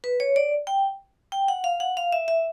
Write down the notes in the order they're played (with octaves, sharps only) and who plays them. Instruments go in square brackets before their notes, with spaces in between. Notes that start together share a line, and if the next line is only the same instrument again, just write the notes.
[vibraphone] B4
C#5
D5
G5
G5
F#5
F5
F#5
F5
E5
E5